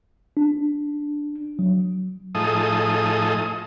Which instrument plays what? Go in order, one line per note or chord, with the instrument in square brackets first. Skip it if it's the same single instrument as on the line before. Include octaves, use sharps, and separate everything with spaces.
[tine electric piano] D4
F#3
[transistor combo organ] A2 F3 D#4 G#4 A4 D#6